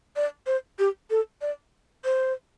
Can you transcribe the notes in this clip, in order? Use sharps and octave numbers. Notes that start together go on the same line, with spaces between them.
D5
C5
G4
A4
D5
C5